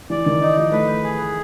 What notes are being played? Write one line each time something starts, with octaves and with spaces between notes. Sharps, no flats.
E3 D5
D#3
D#4
F3
A3 B4
G#4